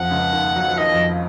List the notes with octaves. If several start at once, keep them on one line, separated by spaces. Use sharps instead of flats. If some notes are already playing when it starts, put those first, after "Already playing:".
Already playing: F2 F3 F#5
C#2 C#3
D#2 D#3
F#3
F3
D#3 D#5
F2 F3